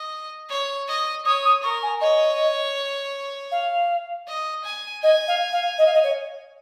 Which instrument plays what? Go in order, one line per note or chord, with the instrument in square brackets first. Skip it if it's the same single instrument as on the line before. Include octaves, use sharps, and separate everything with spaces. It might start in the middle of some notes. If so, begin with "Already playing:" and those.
Already playing: [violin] D#5
C#5
D#5
[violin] C#5 [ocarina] D#6
[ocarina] D#6
[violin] A#4 [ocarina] C#6
[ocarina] G#5
[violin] C#5 [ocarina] D#5
[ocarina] F5
[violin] D#5
G#5
[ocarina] D#5 [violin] G#5
[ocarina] F5
F5
D#5
F5
D#5
C#5